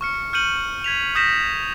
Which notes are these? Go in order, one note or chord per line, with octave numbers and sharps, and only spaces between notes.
C#6 F6 C#7
F6 G6 C#7 D#7 F#7
G#6 B6 F7
D#6 F6 G6 A#6 B6 E7